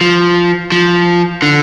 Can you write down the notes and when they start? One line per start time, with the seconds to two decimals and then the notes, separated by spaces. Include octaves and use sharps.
0.01 F3
0.72 F3
1.42 D3